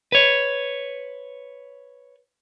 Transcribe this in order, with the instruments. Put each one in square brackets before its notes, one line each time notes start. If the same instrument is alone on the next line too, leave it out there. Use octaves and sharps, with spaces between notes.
[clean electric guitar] B4 C#5